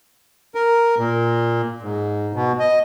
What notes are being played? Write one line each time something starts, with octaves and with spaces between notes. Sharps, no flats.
A#4
A#2
G#2
B2
D#5